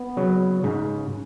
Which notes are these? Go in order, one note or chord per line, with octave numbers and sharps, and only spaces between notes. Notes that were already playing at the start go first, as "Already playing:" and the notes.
Already playing: B3
C#3 F#3
G#2 C#3